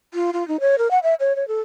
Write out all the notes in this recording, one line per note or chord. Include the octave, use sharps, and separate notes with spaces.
F4
F4
D#4
C#5
A#4
F#5
E5
C#5
C#5
A4